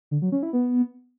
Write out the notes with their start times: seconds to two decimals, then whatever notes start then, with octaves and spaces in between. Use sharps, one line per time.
0.11 D3
0.22 F#3
0.32 C#4
0.43 E4
0.53 B3